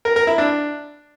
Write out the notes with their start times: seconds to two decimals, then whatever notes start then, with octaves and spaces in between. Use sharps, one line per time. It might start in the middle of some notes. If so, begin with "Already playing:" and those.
0.05 A#4
0.16 A#4
0.27 E4
0.38 D4